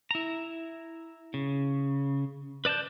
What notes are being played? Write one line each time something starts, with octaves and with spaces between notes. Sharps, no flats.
E4 A#5
C#3
B4 D5 A5 F#6 G6